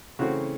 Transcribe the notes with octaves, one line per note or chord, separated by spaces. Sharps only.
C#3 E3 A3 C4 F#4